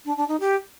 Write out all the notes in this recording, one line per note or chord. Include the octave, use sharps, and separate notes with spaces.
D4
D4
D#4
G4